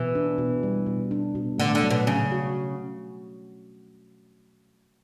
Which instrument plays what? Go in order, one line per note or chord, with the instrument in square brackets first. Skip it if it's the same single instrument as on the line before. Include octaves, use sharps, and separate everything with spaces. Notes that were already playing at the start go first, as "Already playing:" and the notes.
Already playing: [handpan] B2 [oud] E3
[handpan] D4
B2
G3
B2
D4
B2
[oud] D3 [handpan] A3
[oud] D3
[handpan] F#3
[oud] B2
[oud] C#3 [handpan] C#4
[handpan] F#4